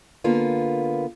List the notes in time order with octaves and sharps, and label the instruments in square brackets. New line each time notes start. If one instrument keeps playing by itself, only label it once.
[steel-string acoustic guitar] D3 A#3 B3 F4